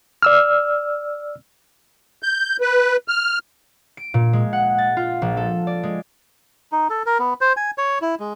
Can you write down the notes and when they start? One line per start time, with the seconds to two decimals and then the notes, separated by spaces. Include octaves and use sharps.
0.22 D5 E6 F6
2.23 G6
2.61 B4
3.08 F6
3.97 D7
4.14 A#2
4.33 G#3
4.53 F#5
4.78 A6
4.97 F4
5.22 A#1
5.37 A4
5.67 D5
5.83 G#3
6.72 D#4
6.90 A4
7.06 A#4
7.19 B3
7.41 C5
7.57 G#5
7.78 C#5
8.02 E4
8.20 G#3